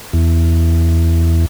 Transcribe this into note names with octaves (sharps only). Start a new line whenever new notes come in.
E2